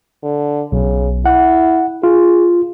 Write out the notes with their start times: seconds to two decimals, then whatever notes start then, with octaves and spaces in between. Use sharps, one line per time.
0.23 D3
0.72 B1 C#3
1.26 E4 F#5
2.03 F4 G#4